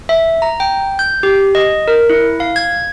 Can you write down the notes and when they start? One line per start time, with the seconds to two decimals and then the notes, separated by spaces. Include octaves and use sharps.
0.09 E5
0.42 A#5
0.60 G5
0.99 G6
1.23 G4
1.55 D#5
1.88 A#4
2.10 E4
2.40 F5
2.56 G#6